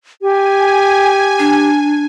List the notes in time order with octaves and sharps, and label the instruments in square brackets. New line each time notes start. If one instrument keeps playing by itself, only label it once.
[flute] G4 [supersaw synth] G#5
[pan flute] D4